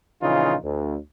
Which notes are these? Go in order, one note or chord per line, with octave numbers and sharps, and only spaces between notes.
A#1 C#3 E3 D#4 F4
D2